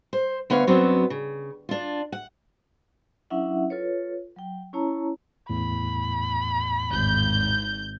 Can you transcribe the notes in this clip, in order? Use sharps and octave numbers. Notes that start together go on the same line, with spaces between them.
C5
D2 B3 C#5 F5
F#2 F#3 B3 C4 D4 C#5
C#3
D4 F4
F#5
F#3 C#4 D4 E4 E5 F#5
F4 A4 B4 C#5
F#3 G5
C#4 E4 C#5 A5 A#5
E2 A2 B5
G#1 G6